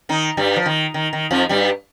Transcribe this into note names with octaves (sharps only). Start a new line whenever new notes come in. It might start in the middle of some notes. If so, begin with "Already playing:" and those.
D#3 D#4
G2 G3
F3
D#3
D#3
D#3
F2 F3
G2 G3